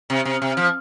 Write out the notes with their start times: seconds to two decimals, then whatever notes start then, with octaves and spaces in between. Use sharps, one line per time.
0.10 C3
0.25 C3
0.42 C3
0.57 F3